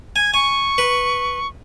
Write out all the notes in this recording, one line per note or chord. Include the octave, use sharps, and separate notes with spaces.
G#5 G#6
G#5 C#6
B4